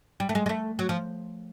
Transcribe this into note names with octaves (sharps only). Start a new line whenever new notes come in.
G3
A3
G#3
G#3
A3
F#3
F3